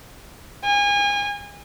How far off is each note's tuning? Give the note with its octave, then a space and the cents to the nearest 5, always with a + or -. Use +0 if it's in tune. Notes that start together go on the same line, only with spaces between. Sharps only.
G#5 -35